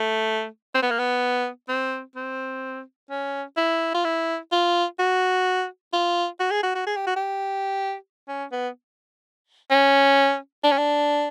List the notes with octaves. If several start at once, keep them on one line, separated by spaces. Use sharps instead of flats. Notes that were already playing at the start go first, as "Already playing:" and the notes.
Already playing: A3
C4
B3
A#3
B3
C4
C4
C#4
E4
F4
E4
F4
F#4
F4
F#4
G#4
F#4
F#4
G#4
G4
F#4
G4
C#4
B3
C#4
D4
C#4
D4